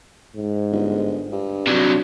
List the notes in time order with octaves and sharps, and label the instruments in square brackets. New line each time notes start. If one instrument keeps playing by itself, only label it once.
[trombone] G#2
[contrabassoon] G1
G2
[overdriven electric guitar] C3 F#3 [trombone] D4